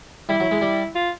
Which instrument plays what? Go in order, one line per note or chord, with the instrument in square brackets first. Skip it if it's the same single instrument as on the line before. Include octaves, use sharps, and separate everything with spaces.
[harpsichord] G3 [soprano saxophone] E4
[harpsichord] F#3
G#3
G3
[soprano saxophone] F4